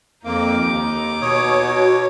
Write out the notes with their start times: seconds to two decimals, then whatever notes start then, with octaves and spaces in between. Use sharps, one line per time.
0.25 F2 A#3 D#4 D6
0.63 D#2
1.22 B2 C#5 D#6
1.62 F#4